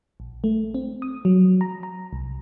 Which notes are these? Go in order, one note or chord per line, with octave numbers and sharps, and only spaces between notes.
A#1
A3
C4
D#6
F#3
A#5
A#5
C2